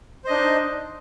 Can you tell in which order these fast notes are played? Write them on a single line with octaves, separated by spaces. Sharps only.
C5 D#5 D4 D#4